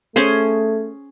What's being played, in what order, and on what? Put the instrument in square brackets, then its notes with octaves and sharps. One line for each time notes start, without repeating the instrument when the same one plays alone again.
[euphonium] A3 [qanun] C#4 G#4 C5